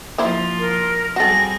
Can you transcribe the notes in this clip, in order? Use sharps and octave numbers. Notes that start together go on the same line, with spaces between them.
F3 A#3 E4 F4 C5
A#4
G3 C4 F#4 G#4 A4 A#6